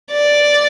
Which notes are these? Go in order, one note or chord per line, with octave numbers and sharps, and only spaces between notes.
D5